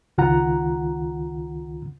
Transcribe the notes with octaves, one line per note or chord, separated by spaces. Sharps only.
C#2 D#3 F4 F#5 A#5